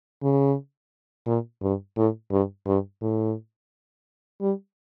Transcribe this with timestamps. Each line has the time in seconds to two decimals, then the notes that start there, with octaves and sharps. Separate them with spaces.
0.23 C#3
1.26 A#2
1.62 G2
1.97 A2
2.31 G2
2.67 G2
3.01 A2
4.41 G3